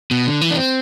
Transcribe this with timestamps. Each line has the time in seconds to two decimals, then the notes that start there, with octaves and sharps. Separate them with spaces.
0.11 B2
0.26 D3
0.41 E3
0.51 D4
0.56 C4